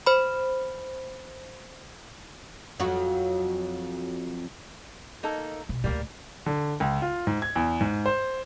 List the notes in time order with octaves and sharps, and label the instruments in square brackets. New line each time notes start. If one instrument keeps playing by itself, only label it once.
[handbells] C5 B5
[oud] F2 F#3 F#4
[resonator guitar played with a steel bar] A#3 D#4 A4
[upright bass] B1
[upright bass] D2 A2 [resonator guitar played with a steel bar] G3 A#3
[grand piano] D3
C#2
F4
G#2
G#6
E2
G#2
C5